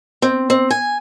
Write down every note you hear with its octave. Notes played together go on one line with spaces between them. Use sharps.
C4
C4
G#5